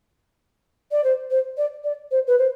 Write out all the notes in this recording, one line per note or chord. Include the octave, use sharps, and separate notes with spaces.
D5
C5
C5
D5
D5
C5
B4
C5